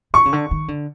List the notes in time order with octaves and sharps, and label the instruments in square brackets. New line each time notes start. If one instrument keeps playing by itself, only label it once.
[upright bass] D3 [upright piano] C#6
[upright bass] C#3
D3
D#3
D3